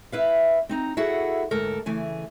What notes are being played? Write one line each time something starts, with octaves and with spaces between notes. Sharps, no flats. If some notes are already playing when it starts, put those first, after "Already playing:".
E4 B4 F5
C4 D#4 A#5
E4 F#4 G#4 A4 F#5
D2 G#2 A4 A#4
C#3 E3 A3 G#5